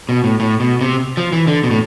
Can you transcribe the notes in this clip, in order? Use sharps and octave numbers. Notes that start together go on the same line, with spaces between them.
B2
A2
A2
B2
C3
F3
E3
D3
B2
A2